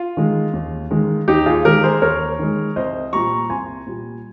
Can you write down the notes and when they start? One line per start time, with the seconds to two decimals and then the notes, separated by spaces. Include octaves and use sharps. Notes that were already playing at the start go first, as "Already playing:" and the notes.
Already playing: F4
0.17 D#3 G#3
0.53 D#2
0.91 D#3 G#3
1.28 D#2 D#4 G4
1.46 F4 G#4
1.65 D#3 G#3 G4 A#4
1.83 G#4 C5
2.02 D#2 A#4 C#5
2.39 D#3 G#3
2.76 C2 C5 D#5
3.13 A#2 G3 A#5 C#6
3.50 C2 G#5 C6
3.87 A#2 G3